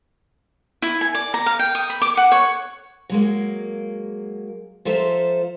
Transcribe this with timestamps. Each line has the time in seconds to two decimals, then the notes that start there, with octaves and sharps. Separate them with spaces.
0.82 E4
1.01 G#5
1.15 D5
1.34 A#5
1.46 F5
1.59 G5
1.75 D#6
1.90 B5
2.02 D6
2.17 F#5
2.32 C#5
3.10 F#3 G#3 A#3
4.85 F3 F4 A4 C5 E5 A#5